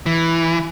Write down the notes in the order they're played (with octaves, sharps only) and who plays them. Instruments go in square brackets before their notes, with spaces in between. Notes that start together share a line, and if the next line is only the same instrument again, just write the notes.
[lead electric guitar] E3